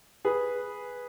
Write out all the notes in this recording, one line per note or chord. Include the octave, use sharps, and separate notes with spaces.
G#4 B4